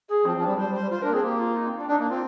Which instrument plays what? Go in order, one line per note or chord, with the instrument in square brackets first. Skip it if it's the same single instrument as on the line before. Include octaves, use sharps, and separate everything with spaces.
[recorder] G#4
[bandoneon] F3 [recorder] C4
[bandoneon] F3
[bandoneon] G3 [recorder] D4
[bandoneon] G3 [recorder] C5
[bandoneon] G3
[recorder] C5
[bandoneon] G3
[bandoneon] F4 [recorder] C5
[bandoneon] D4 [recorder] A#4
[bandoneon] A#3
[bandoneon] C4 [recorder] G#4
[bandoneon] A#3 [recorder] G4
[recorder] F4
D#4
C4
D4
[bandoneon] D4 [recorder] D#4
[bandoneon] A#3 [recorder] D4
[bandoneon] C4 [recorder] F4